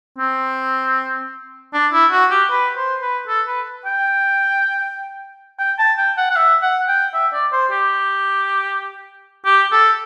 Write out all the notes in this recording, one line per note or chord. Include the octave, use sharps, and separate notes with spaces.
C4
D4
E4
F#4
G4
B4
C5
B4
A4
B4
G5
G5
A5
G5
F#5
F#5
E5
F#5
G5
E5
D5
C5
G4
G4
A4